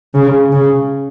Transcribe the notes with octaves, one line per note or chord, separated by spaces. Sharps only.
C#3
C#3